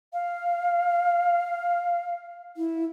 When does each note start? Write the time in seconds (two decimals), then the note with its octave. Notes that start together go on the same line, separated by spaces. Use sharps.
0.13 F5
2.57 E4